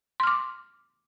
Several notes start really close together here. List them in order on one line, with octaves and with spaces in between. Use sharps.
C6 F6 D6